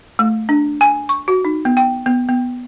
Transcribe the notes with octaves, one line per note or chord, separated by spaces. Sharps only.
A3
D4
G#5
C#6
F#4
D#4
B3
G5
B3
B3